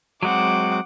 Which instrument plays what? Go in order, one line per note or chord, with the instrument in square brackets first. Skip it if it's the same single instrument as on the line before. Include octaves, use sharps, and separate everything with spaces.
[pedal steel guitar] F#3 G#3 C4 [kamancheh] F#5 D6